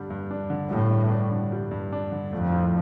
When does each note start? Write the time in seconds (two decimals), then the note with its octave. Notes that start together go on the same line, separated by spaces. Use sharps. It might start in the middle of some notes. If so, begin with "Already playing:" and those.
Already playing: G2 D3 G3 D4
0.10 G2
0.31 D4
0.50 D3
0.71 A2 G3
0.91 G2
1.11 D4
1.31 D3
1.52 G3
1.71 G2
1.92 D4
2.12 D3
2.32 F2 A3
2.52 A2